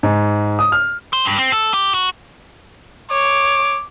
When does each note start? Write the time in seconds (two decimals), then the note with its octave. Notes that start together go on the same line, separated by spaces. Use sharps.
0.03 G#2
0.59 D#6
0.72 F6
1.13 C5
1.25 G2
1.39 C4
1.52 A4
1.74 G4
1.94 F#4
3.11 C#5 D6